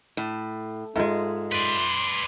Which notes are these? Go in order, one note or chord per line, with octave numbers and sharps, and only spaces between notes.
A2
G#2 G#3 F4 A4 E5
B4 D5 C6